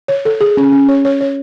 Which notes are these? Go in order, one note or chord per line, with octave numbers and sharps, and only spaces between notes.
C#5
A4
G#4
C#4
C#4
C#5
C#5
C#5